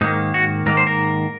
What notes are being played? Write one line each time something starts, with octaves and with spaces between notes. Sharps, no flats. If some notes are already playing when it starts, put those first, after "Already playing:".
G#2 D#3 A#3 D#4
F#4
G#2 D#3 A#3 A#4
C5
A#4